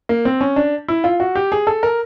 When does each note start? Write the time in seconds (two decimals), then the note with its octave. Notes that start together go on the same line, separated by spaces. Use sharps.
0.09 A#3
0.25 C4
0.41 C#4
0.56 D4
0.88 E4
1.04 F4
1.20 F#4
1.36 G4
1.52 G#4
1.67 A4
1.83 A#4